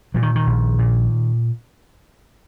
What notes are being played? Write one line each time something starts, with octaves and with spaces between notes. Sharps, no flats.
A#2 F#3
D#3
D#3
A#1
A#2